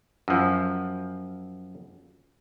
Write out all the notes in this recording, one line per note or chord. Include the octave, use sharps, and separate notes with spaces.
F#2 F3